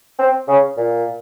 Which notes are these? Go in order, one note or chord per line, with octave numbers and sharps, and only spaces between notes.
C4
C#3
A#2